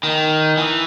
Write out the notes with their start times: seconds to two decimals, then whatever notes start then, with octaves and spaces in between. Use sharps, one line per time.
0.03 D#3
0.57 E3